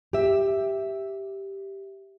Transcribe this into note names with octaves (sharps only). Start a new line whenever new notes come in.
G4 E5